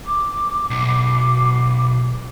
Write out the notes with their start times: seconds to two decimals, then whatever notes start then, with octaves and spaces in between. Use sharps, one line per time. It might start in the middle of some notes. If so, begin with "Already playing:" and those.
0.06 D6
0.70 B1